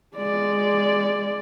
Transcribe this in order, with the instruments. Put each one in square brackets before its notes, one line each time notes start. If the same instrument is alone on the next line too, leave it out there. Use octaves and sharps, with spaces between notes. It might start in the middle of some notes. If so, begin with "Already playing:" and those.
[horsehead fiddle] G#3 D5